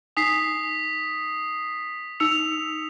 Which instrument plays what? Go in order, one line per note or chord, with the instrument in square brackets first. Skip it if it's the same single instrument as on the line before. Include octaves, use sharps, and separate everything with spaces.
[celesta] D#4 G#5 [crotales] D#6 B6 C7
[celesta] D#4 E6 C#7 [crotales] F7